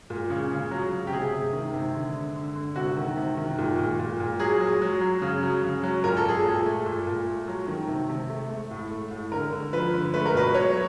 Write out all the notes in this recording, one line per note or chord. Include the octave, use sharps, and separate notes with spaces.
A#2
C#3
C#3
F#3
C#3
G4
C3 G#4
C3
D#3
C3
D3
D3
D3
D3
C3 F#4
D#3
C3
D#3
A#2
A#2
A#2
A#2
F#3 G#4
F#3
F#3
F#3
C#3
F#3
C#3
F#3
A#2 A#4
A4
A#2 G#4
A#2 A4
A3
A#2
A#2
A3
F#3
D#3
C3
C3
A3
A3
A2
A3
A2
D3 A#4
D3
F3 B4
D3
A3 B4
A#4
B2 B4
F#3 C#5